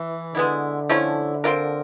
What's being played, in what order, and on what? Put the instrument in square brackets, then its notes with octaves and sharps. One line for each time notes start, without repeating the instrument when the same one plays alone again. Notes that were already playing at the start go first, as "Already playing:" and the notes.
Already playing: [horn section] E3
[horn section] D3 [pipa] G#3 B3 E4
[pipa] F3 A3 C#4 E4
C4 F4 A#4